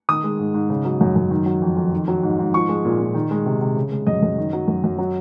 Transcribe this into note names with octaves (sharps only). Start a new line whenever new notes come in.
D#3 D#6
G#3
G#2
G#2
C#3
F#3
F#2
F#2
D#3
F#3
F2
F2
D#3
F#3
G#2
G#2
F3 C#6
G#3
A#2
A#2
D#3
G#3
C3
C3
C#3
G#3
F#2 D#5
F#2
D#3
F#3
F#2
F#2
F#3